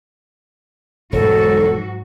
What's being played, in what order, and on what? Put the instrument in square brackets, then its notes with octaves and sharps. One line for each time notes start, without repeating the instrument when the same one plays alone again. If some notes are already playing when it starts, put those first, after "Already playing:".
[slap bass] E1 [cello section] G#2 F#3 F#4 [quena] A4